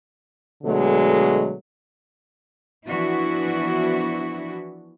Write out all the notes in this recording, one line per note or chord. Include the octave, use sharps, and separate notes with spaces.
B2 D3 F#3 G#3 A3
E3 F3 B3 D4 E4 F#4